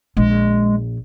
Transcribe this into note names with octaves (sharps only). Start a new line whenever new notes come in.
A#1 G#3